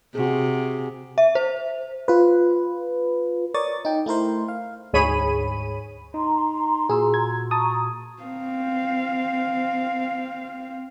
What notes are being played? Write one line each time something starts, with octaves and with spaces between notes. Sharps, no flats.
C3 F#4 G#4
E5
C5
F4 B4
A#4 C#5 D5 C#6 D#6 A6
D#4 G5
A3 E4 A#4 C5
F5
D2 G#2 G#4 C#5 B5 D#7
D#4 A#5 C6
A#2 F#4 G#4 E6
G#6
A5 A#5 C#6 D#6
C4 F5